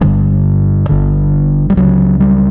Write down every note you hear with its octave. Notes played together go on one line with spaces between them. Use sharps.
G1 G2 D3 E3
G1 G2 D3
G3
C#2 C#3 F#3
G3